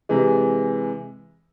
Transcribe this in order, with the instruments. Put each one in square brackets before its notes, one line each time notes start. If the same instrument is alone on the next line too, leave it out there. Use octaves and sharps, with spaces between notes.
[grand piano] C3 E3 G#3